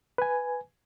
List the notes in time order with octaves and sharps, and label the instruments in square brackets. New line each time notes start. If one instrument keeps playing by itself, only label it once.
[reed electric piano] B4 G#5